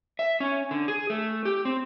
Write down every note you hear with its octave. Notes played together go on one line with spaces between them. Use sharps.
E5
C#4
D3
G#4
A3
G4
C4